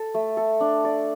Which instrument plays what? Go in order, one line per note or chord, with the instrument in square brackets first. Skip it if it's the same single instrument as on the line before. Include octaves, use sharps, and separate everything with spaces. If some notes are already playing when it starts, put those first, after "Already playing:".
Already playing: [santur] A4
A3
A4
D4
D5